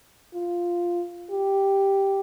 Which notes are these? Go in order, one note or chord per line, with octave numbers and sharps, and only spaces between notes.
F4
G4